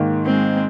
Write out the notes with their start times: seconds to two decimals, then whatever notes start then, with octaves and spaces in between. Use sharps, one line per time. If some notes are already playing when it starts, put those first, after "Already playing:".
Already playing: G#2 D#3 A#3
0.25 G#3 C4